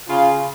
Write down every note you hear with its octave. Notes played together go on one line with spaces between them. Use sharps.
C#3 F4